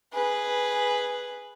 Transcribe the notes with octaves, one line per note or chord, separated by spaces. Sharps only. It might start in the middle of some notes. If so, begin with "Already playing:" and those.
G#4 B4